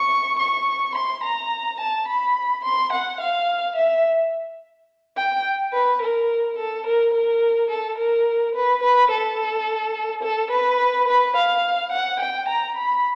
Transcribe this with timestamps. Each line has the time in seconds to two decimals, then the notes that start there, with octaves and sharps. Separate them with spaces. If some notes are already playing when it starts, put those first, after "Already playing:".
Already playing: C#6
0.39 C#6
0.95 C6
1.24 A#5
1.80 A5
2.08 B5
2.64 C6
2.93 F#5
3.20 F5
3.76 E5
5.17 G5
5.73 B4
6.02 A#4
6.58 A4
6.86 A#4
7.14 A#4
7.70 A4
7.98 A#4
8.55 B4
8.82 B4
9.11 A4
10.23 A4
10.51 B4
11.08 B4
11.36 F5
11.92 F#5
12.20 G5
12.48 A#5
12.77 B5